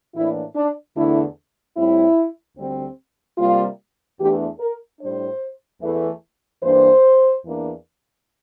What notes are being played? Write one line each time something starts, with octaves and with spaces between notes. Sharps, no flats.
A2 E3 A#3 D4 E4
D4
E2 D3 A3 D4 E4
A2 G3 C4 E4
D2 D3 G3 C4
C3 G3 A#3 F4
E2 E3 A3 D4 G4
A#4
A2 G3 D4 C5
E2 E3 A3
G2 E3 A#3 D4 C5
E2 E3 A#3 D4